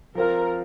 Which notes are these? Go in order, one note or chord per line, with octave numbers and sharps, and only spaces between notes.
F3 C4 F4 A#4